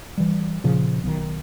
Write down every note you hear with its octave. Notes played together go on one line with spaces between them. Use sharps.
E3 G3
A#2 C#3 F3
B1 D#3